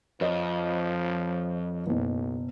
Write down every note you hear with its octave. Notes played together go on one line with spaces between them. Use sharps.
F2 F3 C#5 D#5
F#1 B1 B2